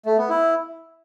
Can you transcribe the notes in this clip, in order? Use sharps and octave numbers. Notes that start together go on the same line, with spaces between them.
A3
B3
E4